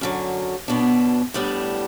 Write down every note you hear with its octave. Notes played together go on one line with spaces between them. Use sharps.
F#2 D3 F#3
B2 F#3 B3 D4
A2 G3 B3 D4